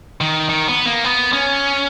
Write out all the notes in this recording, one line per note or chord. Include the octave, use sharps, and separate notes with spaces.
D#3
D#3
B3
A#3
B3
C#4